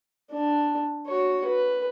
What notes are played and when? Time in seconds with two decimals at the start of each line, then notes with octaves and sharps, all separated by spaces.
0.31 D4
1.07 F#4 C#5
1.45 B4